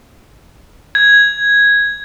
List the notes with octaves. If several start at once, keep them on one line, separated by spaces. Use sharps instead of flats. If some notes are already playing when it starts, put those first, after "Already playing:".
G#6